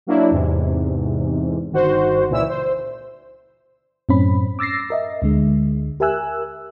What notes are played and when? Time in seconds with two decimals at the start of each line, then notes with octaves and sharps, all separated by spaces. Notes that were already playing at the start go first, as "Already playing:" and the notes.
0.07 F#3 A#3 D4 E4
0.31 E2 G#2 C3
1.71 G1 D#3 F#4 C5
2.29 C#2 A#2 E3 E4 E6
2.49 C5
4.09 F#2 A2 C4 C#4 B5
4.59 D6 E6 A6 A#6 C7
4.90 A#4 D#5 E5
5.22 D2 D3 G#3
6.00 G4 A#4 E5 G#5 E6 F#6